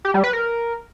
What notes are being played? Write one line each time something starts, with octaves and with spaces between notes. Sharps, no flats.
G4
G3
B4
A#4